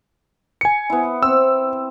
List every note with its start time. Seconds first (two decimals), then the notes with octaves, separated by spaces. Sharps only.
0.61 G#5 C#7
0.90 B3 E4
1.23 C4 E6